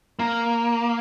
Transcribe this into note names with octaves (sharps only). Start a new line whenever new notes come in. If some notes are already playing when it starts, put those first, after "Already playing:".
A#3